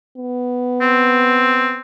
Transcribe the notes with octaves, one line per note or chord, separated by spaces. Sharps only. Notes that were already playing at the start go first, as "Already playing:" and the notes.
B3
C4